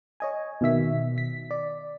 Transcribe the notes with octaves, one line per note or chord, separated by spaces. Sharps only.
C#5 D#5 G#5
B2 D#3 E5 B6
B6
D5